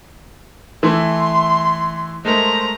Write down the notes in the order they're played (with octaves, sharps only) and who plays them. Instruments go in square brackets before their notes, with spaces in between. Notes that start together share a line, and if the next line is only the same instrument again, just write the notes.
[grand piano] E3 A3 E4 [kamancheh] C6
[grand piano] G#3 A3 A#4 [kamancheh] C5 A#5